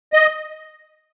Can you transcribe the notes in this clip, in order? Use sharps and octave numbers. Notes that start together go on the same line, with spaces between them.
D#5